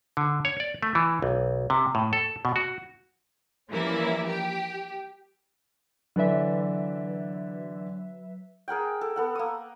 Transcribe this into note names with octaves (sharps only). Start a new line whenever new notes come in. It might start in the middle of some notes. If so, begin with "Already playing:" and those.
D3
C#5
D5
A3
E3
B1
C3
A2
A4
B2
F#4
E3 F3 G3 A#3 C#4 E4
G4
D3 E3 F#3 B4 D5 E5
G#4 A#4 F#5 G5
A4
B3 A4 F#5
A#3 D#6